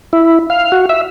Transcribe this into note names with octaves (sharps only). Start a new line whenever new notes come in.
E4
F5
F#4
E5